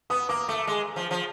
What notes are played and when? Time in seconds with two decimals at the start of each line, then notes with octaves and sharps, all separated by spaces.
0.10 B3 D#6
0.29 A#3 D6
0.48 A3 D6
0.67 G#3
0.96 F3
1.11 F3